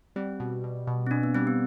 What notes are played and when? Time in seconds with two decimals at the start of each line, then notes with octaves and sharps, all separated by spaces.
0.16 G3 C4
0.40 B2
0.64 B2
0.87 B2
1.06 C4
1.11 B2 D4
1.23 B3
1.35 G3 C4
1.47 B3